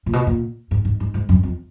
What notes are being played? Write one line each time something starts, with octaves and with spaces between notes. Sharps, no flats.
A#2
B2
A#2
G#2
G#2
G#2
G#2
F#2
F2